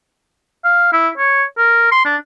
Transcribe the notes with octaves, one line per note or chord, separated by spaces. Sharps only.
F5
E4
C#5
A#4
C6
D4